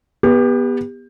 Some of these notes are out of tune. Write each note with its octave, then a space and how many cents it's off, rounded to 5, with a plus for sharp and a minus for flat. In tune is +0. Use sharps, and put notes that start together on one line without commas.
B3 -15 G4 +25